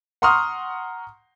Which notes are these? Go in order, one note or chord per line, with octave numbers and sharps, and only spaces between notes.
F#5 A#5 C6 C#6 D#6 F6